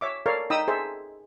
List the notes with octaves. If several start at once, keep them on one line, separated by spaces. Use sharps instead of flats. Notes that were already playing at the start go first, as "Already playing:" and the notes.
C#5 E5 D6
A4 A#4 C#5 D5 F5
D#4 G5 B5 D#6 E6
G#4 A4 C5 E5